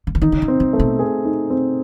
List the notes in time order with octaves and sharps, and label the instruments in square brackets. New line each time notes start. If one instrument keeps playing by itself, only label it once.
[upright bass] C#3
D3
[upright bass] D#3 [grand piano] D#4
[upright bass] D3
C#3
[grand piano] C4
[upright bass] C3
[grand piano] A3
[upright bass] B2
[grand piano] G#4
D#4
C4